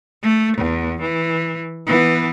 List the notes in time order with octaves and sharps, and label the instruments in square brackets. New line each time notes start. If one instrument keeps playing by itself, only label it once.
[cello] A3
E2
E3
E3 B3